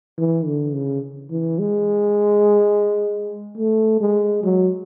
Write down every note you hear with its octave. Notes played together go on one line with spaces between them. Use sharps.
E3
D3
C#3
E3
G#3
A3
G#3
F#3